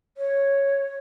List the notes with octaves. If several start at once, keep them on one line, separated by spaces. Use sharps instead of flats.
C#5